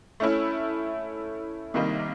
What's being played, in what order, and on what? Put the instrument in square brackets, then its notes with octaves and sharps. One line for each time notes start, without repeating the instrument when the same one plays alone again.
[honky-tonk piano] A3 C#4 E4
C3 D#3 G3 A#3 D#4